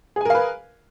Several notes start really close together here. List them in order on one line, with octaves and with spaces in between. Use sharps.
G#4 G#5 A#4 F5 B4